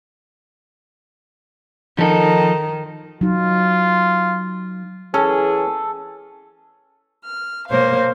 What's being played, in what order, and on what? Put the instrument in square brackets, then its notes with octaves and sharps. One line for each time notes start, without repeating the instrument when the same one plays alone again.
[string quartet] D#3 [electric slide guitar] F3 A4
[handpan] F#3 D#4 [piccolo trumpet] F4
[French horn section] E3 G#4 [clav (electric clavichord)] C#4 [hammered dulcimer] A4
[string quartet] F6
B2 A#3 C5 C#5 F5